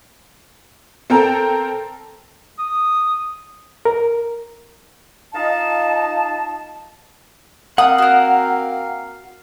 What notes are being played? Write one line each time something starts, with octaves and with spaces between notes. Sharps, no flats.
C4 A4 A#4 G5 A5 A#5
D#6
A#4
D#4 F4 D#5 F5 A5
A#3 C4 F5 F#5 D#6
F#4 A#4